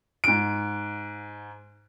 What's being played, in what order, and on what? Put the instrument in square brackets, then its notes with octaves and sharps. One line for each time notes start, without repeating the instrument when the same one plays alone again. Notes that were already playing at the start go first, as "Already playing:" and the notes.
[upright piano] G#2 D7